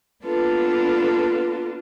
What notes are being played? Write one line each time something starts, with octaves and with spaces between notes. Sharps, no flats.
A#3 B3 D4 F4 A4 B4